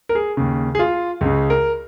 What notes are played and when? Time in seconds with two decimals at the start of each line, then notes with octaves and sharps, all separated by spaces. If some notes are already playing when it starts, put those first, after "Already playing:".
0.09 A#4
0.15 G#4
0.37 D#2 C#3
0.75 G#4
0.79 F4
1.21 C#2 C#3
1.50 A#4